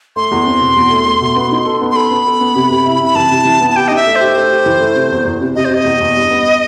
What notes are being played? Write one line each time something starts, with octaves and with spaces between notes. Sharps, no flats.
A3 C6
E2
C4
B2
E2
A3
A3
B2
B3
D#4
A4
B3
C6
A4 B5
B3
A4
B3
C3
C3
E4
C3 B5
E3 A5
C3
E3
B3
A5
G4 G5
D#5
D#4 E5
A3
G4 C5
A3
G4
E3
A3
C3
E2
E2
C3
C3 D#5
C5
C3 D#5
E2
E2
G2
B3